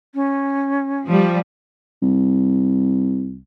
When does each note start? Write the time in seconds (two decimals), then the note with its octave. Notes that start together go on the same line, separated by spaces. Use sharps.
0.15 C#4
1.06 F3 G3
2.02 C2